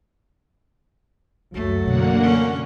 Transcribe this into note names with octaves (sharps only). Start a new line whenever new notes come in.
C#2 F#2 F#3 A3
B2 D3 E3 A#3 F#5
C#4